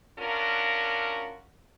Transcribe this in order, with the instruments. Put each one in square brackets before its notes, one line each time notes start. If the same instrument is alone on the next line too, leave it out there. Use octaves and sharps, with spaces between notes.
[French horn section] C#4 D4 F4 F#4 A#4